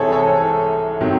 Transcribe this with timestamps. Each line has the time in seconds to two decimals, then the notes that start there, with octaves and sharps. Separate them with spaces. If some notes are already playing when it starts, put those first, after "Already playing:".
Already playing: C2 C3 E3 G#4 A4 C5 C#5
0.12 A4 C#5
1.01 C3 D#3 F#3